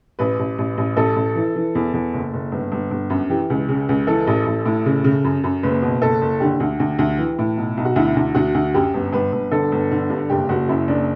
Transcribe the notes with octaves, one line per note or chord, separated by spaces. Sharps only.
A1 B4
A1
A1
A1
A1 A4
A1
E3
E3
E2
E2
F#1
F#1
G1
G1
G1
F#2
E3 G4
C#2
C#3
C#2
E3 A4
A1
A1
A2
C#3
C#3
F#2
F#2
F#1 B4
B2
F#1 A4
F#1
D3 G4
D2
D2
D2
E3
A2
B1
B1
F#4
D2 E4
D2
D2 F#4
D2
F#2 G4
G1
G1 B4
G1
D3 A4
G1
D3
G2
F#1 G4
F#1 F#4
F#2 E4
F#1 D4